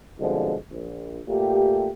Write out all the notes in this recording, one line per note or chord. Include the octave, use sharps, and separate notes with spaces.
C2 B2 D3 F3 G#3
A#1
A#2 A3 G4